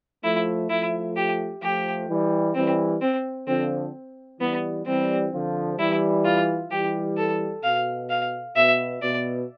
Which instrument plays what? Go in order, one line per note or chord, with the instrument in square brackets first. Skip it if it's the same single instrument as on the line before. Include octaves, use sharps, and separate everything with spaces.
[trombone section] F3 A3 [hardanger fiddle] E4
[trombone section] F3 A3 [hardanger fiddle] E4
[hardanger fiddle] G4
[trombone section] F3 A3 [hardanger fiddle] G4
[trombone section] E3 G3
[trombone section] E3 G3 [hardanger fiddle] C4
[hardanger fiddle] C4
[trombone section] D3 F3 [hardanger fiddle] C4
[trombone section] E3 G3 [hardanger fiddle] B3
[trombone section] E3 G3 [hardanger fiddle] C4
[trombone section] D3 F3
[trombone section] E3 G3 [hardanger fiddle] E4
[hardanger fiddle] F4
[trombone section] E3 G3 [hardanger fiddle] G4
[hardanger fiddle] A4
[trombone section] B2 [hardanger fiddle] F5
[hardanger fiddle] F5
[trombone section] B2 [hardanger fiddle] E5
[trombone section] B2 [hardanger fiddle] D5